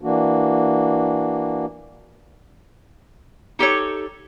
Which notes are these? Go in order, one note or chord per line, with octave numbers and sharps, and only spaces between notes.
E3 A#3 D4 F#4
D#4 G4 A4 C#5